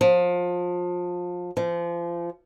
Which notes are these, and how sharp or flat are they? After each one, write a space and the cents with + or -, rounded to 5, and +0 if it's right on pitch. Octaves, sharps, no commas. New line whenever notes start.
F3 +25
F3 -30